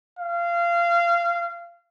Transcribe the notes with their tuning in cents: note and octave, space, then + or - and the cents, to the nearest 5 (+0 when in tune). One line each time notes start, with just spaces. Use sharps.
F5 -25